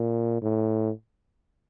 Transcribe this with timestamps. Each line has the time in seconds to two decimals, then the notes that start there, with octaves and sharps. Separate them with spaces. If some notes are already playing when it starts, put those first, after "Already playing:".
Already playing: A#2
0.42 A2